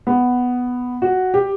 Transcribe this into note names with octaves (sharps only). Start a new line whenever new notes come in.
B3
F#4
G4